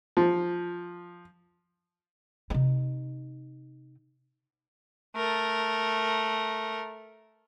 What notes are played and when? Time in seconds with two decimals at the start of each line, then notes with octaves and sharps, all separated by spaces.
0.17 F3
2.50 C3 D#4
5.16 A3 A#4